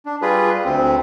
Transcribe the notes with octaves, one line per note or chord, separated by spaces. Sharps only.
D4
G3 F4 G#4 B4
D2 C4